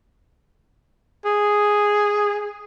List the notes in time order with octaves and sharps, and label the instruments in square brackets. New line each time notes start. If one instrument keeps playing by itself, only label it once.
[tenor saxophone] G#4